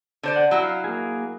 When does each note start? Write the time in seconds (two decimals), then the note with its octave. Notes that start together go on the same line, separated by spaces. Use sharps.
0.23 D3 C5 D5
0.36 F#5
0.51 F#3 E4 F#4
0.64 F5
0.84 A#3 G#4